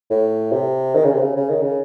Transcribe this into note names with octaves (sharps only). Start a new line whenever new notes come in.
A2
C3
D#3
C#3
C3
C#3
C#3
D#3
C#3